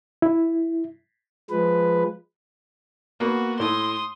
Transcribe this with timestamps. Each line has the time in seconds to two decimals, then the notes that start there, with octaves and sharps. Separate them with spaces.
0.22 E4
1.50 F3 G#3 B4
3.20 A#3 B3 F#4
3.60 A2 C6 D#6